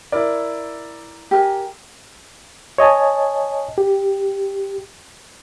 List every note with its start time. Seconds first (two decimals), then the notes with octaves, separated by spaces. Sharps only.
0.12 E4 A#4 D5
1.31 G4 A#4 G#5
2.78 C#5 D#5 G#5 A5
3.78 G4